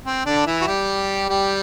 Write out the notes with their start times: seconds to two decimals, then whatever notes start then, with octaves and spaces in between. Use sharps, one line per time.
0.06 C4
0.26 D3 D4
0.46 E3 E4
0.62 F#4
0.67 G3 G4
1.29 G3 G4